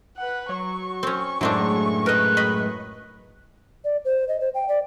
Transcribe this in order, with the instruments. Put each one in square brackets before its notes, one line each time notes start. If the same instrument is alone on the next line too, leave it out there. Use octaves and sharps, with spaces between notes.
[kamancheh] B4 F#5
[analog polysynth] F#3 [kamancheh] C#6
[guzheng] C4 C#4
[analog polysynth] F#2 A2 G#3 [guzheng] F#3 C4 D4
[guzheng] A#4 D#5 [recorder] B4
[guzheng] D#5 B5
[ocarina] D5
C5
D#5
C5
G5
D5